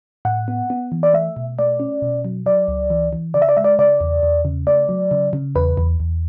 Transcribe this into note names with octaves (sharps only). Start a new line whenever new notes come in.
A2 F#5
B3
B3
E3
D5
A3 E5
B2
A3 D5
C#4
B2
F#3
F#3 D5
C#2
E3
E3
C#3 D5
E5
D5
G#3 E5
D5
C#3 D5
E2
E2
C#3
A3 D5
F#3
C#3
C#3
E2 B4
E2
E2